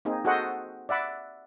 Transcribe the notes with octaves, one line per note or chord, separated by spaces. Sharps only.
A#3 C4 D#4 G#4
F#4 G#4 A4 C5 D#5 F#5
D5 E5 F#5 B5